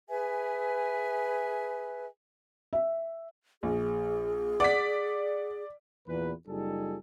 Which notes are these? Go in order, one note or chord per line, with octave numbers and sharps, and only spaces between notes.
G#4 B4 E5 G#5
E5
A#1 G#4
D5 F#5 D6 B6
E2 A#2 B4
F#1 G3 D#4 F4 G#4 A4